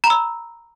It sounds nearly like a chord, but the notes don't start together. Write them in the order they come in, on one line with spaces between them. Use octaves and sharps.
A#5 B5 E6